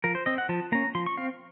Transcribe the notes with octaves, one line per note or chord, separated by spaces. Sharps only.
F3 A#4
C5
C4 D#5
F#5
F3 A5
A#3 C#4 A#5
F3 C6
C#6
C4 F5